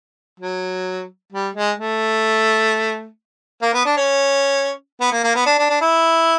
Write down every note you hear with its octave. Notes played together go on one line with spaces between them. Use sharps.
F#3
G3
G#3
A3
A#3
B3
D4
C#4
B3
A#3
A#3
B3
D4
D4
D4
E4